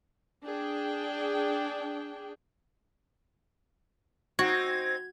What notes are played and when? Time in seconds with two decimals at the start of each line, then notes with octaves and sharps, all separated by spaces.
0.43 D4 G#4 G5
4.39 C4 D#4 F#4 G#6